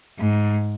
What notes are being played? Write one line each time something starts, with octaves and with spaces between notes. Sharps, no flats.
G#2